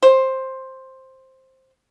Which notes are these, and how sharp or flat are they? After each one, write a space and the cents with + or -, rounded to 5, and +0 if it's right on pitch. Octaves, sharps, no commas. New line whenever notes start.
C5 +10